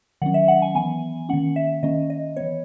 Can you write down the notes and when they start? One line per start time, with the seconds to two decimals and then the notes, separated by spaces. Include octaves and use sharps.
0.22 D#3 F#3 C#4 F#5
0.34 E5
0.48 F#5
0.62 G#5
0.75 E3 B3 G#5
1.29 D#3 A#3 C#4 F#5
1.56 E5
1.83 D#3 A#3 C#4 D#5
2.10 D#5
2.36 E3 B3 C#5